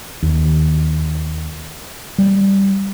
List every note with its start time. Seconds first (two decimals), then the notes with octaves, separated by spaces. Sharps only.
0.23 D#2
2.18 G3